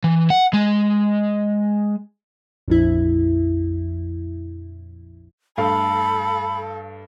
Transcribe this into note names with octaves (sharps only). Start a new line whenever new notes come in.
E3
F#5
G#3
A#1 F2 E4
G2 A3 A4 F5 B5